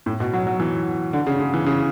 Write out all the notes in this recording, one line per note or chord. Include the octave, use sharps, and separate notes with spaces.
A2
B2
F#3
F#3
E3
D3
C#3
C#3
E3
C#3